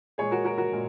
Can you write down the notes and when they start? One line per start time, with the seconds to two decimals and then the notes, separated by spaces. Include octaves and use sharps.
0.18 A#2 G#3 G#4 C#5
0.31 F#4 A#4
0.44 F#4 A#4
0.58 F#4 A#4
0.72 A#2 G#3